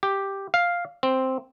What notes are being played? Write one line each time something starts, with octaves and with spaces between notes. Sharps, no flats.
G4
F5
C4